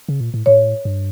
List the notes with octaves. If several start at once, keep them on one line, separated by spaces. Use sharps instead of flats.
C#3
A#2
A2
A2 C#5
G2